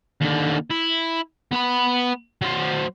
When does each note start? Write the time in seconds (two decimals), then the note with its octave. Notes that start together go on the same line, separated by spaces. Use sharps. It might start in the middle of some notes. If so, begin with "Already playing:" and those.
0.21 D#2 D3
0.70 E4
1.52 B3 B5
2.41 F#3 C5